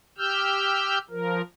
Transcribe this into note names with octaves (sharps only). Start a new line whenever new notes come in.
G4 E6 F6 G6
F3 A#4